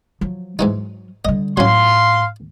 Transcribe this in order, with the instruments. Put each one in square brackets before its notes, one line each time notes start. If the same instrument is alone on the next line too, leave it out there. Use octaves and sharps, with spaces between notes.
[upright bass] F3 F#3
[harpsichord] G#2 E3 D#4 [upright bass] F#3
[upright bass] D3 G3 [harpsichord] D#5
[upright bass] A2 [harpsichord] F#3 C#4 [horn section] F5 C6